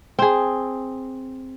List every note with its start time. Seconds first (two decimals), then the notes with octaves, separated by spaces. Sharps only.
0.19 C4 G#4